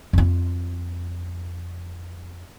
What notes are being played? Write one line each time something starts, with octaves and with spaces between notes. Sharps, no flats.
F2 F4